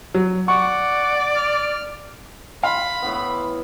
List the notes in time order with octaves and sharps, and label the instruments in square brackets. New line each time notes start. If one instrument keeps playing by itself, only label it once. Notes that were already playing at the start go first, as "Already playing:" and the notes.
[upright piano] F#3
[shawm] D5 [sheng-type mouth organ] F#5 [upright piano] C#6
[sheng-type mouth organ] F6
[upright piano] F5 C6 [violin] B5
[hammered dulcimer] A2 E3 B3